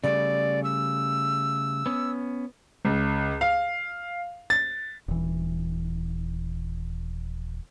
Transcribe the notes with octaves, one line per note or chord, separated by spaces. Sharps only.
C#3 G3 A3 D5
E6
B3 C#4
C#2
F5
A6
D#1 E3